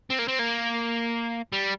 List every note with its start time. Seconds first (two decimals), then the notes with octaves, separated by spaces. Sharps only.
0.10 C4
0.19 A#3
0.28 C4
0.39 A#3
1.52 G3